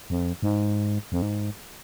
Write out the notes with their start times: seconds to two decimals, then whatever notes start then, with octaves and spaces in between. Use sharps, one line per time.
0.10 F2
0.42 G#2
1.12 F2
1.22 G#2